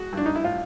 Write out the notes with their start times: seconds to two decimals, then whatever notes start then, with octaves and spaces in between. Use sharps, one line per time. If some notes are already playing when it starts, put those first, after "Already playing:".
Already playing: G#3 F#4
0.13 G2 D4
0.26 D#4
0.35 E4
0.44 A2 F4